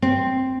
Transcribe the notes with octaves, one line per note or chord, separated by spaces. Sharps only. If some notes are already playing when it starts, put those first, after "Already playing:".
C4